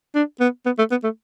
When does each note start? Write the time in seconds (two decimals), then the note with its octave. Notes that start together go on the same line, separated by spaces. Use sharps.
0.15 D4
0.40 B3
0.66 B3
0.78 A3
0.91 B3
1.04 A3